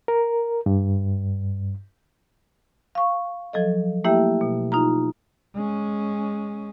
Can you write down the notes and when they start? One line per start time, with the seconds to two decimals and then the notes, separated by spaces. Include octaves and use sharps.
0.08 A#4
0.66 G2
2.95 F5 C#6
3.53 F3 F#3 A4 D#5
4.04 A3 A#3 E4 G4 E5 G5
4.41 B2
4.72 D#4 F4 A#5
5.54 G#3 C#4